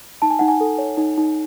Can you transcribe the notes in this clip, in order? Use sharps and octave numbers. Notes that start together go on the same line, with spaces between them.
D#4 A5
G#5
D#4 F#5
G#5
A4
C#5
D#4
D#4